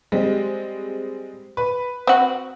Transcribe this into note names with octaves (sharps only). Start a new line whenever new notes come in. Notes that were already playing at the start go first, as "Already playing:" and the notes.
G3 G#3 C4
B4
C4 F#4